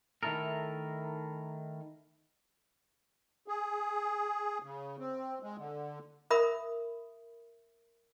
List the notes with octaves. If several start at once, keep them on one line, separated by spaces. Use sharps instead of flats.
D#3 A3 E4 A4 A#4
G#4
C#3
C4
G#3
D3
A#4 E5 B5 D#6